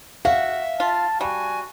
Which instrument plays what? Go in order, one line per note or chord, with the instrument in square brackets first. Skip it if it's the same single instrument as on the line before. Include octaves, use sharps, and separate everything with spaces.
[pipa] F#4 [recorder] E5 [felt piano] F5
[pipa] F4 [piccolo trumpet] A5
[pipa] G3 [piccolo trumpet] F#4 [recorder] G#5